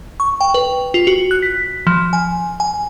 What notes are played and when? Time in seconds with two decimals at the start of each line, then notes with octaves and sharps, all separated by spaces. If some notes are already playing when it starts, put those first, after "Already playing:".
0.20 C#6
0.41 G5
0.54 B4
0.94 F4
1.07 F#4
1.31 F#6
1.42 B6
1.87 F3
2.13 G#5
2.60 G#5